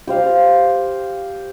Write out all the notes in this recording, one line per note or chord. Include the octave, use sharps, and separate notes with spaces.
G4 C5 F5